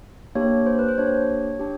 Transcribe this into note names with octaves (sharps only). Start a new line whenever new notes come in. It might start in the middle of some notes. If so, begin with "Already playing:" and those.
A#3 D4 G4 C#5
C5
B4
C5
A#3 D4 G4 C#5
D4 G4